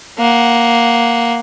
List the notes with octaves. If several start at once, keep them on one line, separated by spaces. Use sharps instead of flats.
A#3 F#5